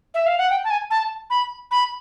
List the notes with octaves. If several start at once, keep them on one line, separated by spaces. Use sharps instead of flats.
E5
F5
F#5
G5
A5
G#5
A5
B5
B5